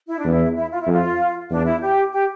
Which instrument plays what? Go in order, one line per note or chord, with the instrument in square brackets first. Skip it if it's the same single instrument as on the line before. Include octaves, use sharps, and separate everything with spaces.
[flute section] E4
D4
[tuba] E2
[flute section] E4
E4
F4
E4
[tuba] F2
[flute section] F4
[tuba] E2 [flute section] D4
[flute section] E4
G4
G4